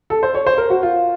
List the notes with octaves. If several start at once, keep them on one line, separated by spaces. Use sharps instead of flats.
A4
C5
C#5
C5
A#4
F#4
F4